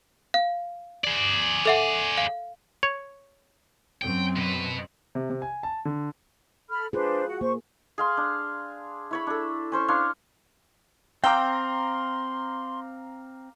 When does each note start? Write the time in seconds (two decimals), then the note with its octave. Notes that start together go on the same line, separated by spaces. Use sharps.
0.34 F5
1.04 G#4 D5
1.65 A4 E5 F#5
2.17 F5
2.83 C#5
4.02 F#2 F#3 C4 G5
4.36 B2 B4
5.15 C3
5.30 C3
5.42 G#5
5.63 A5
5.85 D3
6.70 A4 B5 F6
6.93 D4 F4 G#4 B4 C5
7.28 F#4 F#5
7.41 A#3 C5 C#6
7.98 G#4 F5 C6
8.17 D4
9.11 E4 C#5 B5
9.27 D4 A4
9.72 C#4 C5 C#6
9.88 D4 C#5 F5 C6
11.24 C4 F5 G5 A#5 C6 D6 E6